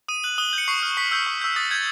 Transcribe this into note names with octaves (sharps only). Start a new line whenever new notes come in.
D#6 D#7
F#6 F#7
D#6 G7
F#7
G6
C#7
C#6 C7
F6
C#6 B6
E6 G6
C#6
E6 G6
D#6 A6
G6 G#6